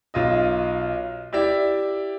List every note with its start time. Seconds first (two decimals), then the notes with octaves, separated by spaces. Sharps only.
0.14 B1 F4 D#5
1.33 E4 G4 D5 E5